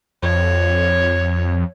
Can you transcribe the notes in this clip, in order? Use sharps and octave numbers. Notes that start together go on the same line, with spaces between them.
F2 C#5